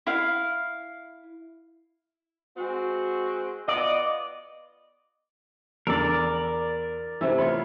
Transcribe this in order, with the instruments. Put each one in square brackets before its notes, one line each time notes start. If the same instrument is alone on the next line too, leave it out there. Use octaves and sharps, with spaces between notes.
[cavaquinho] E4 F5
[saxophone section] G#3 C4 F#4
[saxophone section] B3 F4 D#5 [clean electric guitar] D5
[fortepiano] E2 D3 E6 [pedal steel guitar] A#4 D5
[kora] C3 A3 E4 [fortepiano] E3
[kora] B3 F4 C#5 [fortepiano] B5